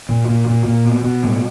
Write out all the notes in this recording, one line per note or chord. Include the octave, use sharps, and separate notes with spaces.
A#2
A#2
A#2
A#2
B2
B2
A2 G3